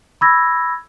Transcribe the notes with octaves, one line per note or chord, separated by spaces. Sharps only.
B5 D6 E6 G#6 A#6